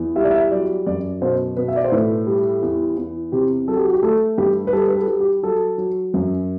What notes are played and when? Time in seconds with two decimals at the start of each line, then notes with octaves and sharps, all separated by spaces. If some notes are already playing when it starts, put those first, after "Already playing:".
Already playing: E2
0.16 G3 E5
0.24 D5
0.31 E5
0.51 F#3 D5
0.86 F#2 D5
1.21 B2 C5
1.57 B2 B4
1.68 E5
1.76 D5
1.84 C5
1.92 A2 B4
2.27 G3
2.62 E2
2.97 E2
3.32 C3 G4
3.68 F#3 A4
3.76 G4
3.85 F#4
3.93 G4
4.03 A3 A4
4.38 G2 G4
4.67 B4
4.73 G3 A4
4.88 B4
4.96 A4
5.08 G3
5.20 G4
5.43 F#3 A4
5.78 F#3
6.14 F#2